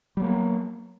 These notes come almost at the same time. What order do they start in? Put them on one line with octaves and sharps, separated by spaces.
G3 F#3 A#3 B3